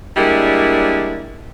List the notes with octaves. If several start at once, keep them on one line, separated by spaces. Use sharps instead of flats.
G3 G#3 A#3 D4 E4